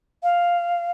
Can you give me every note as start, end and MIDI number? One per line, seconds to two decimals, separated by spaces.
0.23 0.91 77